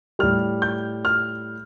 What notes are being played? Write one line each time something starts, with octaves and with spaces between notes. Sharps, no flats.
A2 G3 F6
G6
F6